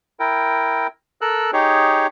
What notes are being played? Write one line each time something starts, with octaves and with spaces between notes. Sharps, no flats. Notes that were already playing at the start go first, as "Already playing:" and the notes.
E4 A#4 G5
A4 A#4 E6 F#6
D#4 G4 G#4 C#5